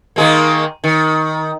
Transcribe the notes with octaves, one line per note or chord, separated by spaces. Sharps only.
D#3 G#3 A#3
D#3